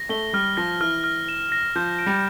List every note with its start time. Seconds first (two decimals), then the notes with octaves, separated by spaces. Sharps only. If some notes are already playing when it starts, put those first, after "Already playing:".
Already playing: A#6
0.09 A3 G7
0.33 G3 F6
0.57 F3 A#6
0.81 E3 F6
1.04 F6
1.29 E7
1.52 A#6
1.76 F3 G6
1.99 D7
2.07 G3